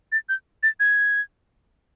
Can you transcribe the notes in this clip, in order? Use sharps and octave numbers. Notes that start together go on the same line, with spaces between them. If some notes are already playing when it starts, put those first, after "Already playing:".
A6
G6
A6
G#6